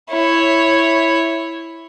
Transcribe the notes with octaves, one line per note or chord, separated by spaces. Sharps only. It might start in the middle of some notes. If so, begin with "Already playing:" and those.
E4 C#5